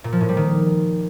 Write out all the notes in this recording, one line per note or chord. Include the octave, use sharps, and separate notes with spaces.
A#2
F3
A2
G3
D#3